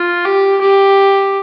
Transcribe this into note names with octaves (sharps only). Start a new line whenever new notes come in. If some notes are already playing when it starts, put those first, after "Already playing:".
Already playing: F4
G4
G4